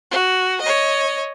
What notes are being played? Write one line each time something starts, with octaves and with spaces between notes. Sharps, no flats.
F#4
C#5 D#5